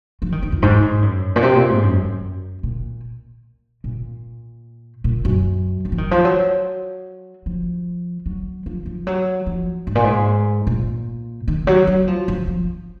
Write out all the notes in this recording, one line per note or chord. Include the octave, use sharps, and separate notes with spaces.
F3
D#3
D#3
F2
G#2
A#2
G#2
F#2
A#2
C3
A#2
G#2
F#2
F#2
A#2
A#2
A#2
F#2
F#2
F3
D#3
F3
F#3
F3
F#3
F3
F3
F#3
F3
G#2
A#2
G#2
A#2
D#3
F#3
F#3
F3
F3
F3